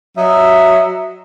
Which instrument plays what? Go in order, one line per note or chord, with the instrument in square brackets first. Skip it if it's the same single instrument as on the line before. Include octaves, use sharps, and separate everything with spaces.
[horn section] F#3 D#5 E5